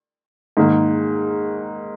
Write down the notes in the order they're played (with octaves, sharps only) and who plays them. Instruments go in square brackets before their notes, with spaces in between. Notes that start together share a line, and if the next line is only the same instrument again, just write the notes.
[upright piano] G#2 D#3 A#3